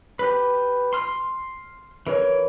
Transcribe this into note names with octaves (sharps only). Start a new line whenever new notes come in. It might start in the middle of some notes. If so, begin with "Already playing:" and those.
G4 B4
C6 F6
E3 A#4 C#5